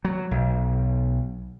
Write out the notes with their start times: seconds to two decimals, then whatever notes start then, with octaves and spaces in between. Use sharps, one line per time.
0.05 F#3
0.31 B1